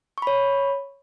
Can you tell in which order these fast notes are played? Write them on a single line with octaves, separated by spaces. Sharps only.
C#6 B5 C#5